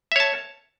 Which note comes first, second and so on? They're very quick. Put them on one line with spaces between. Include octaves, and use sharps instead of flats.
E5 C#5 A5